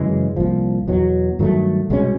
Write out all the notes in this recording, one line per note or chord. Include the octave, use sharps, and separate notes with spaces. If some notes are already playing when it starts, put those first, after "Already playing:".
Already playing: F#2 C#3 E3 G#3
C2 A#2 F3
E2 B2 F#3
G2 D#3 F#3 A3
C2 B2 G#3 C#4